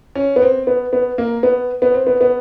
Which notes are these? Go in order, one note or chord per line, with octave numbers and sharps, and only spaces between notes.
C#4
B3
C4
B3
B3
A#3
B3
B3
C4
B3
B3